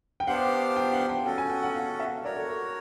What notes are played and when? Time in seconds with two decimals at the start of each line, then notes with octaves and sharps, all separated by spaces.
0.20 G5
0.27 B3 D4 G4 C5 F5 F#5
0.76 G5
0.93 F#5
1.09 G5
1.25 C#4 F#4 A4 G5
1.38 G#5
1.50 G5
1.63 F#5
1.75 F5
1.99 E5
2.24 F#4 A#4 C#5 D5
2.36 A4
2.48 A4